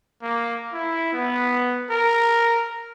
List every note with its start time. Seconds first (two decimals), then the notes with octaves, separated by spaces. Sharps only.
0.22 A#3
0.73 E4
1.13 B3
1.90 A#4